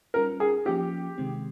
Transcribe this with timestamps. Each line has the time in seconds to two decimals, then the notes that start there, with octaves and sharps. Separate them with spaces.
0.14 G3 C#4 F4 A#4
0.40 G#4
0.65 F3 A#3 C#4 F4 G4
1.18 C3 D#3 G#3 C4